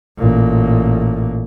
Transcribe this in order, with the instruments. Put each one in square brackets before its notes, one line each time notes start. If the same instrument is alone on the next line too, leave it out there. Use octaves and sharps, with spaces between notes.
[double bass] A1 A#2